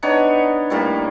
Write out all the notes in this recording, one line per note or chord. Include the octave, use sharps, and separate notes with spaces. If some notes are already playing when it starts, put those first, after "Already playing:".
B3 D4 D#4 C#5
A2 G3 A#3